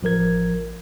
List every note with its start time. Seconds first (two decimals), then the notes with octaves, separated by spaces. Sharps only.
0.03 A1 F3 A#4 G#6